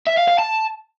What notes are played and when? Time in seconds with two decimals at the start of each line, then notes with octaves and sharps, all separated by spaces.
0.07 E5
0.17 F5
0.28 F5
0.38 A5